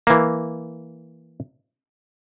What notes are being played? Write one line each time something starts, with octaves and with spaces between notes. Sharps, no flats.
E3 A#3